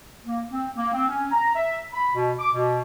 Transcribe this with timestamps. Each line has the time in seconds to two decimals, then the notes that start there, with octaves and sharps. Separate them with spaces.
0.25 A#3
0.50 C4
0.76 A#3
0.93 C4
1.08 C#4
1.32 A#5
1.56 E5
1.93 B5
2.14 B2
2.39 D6
2.54 B2